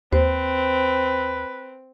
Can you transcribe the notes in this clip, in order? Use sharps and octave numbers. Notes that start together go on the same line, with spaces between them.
D#2 C4 B4 C5